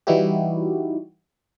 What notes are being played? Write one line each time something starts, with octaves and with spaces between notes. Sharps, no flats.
E3 G3 D#4 E4 F#4 G4